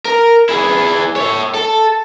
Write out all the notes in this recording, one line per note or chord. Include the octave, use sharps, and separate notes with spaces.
A#4
E4 G#4
C#5 E5
A4